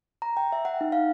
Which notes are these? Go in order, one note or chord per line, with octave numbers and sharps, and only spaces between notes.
A#5
G5
E5
F#5
D#4
F5